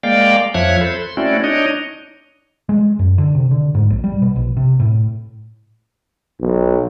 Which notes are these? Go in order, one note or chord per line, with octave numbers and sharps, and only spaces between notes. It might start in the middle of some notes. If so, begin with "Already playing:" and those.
G#3 A#3 D5 F5 G5
F2 F3 C#5 E5 F#6 G#6
A4 C5 B5
C6
A3 C4 C#4 E4 F#4 D5
D4 D#4 C#5 D#5
G#3
F#2
D3
C3
D3
G#2
A#1
G3
B2
A#1
C3
A2
B1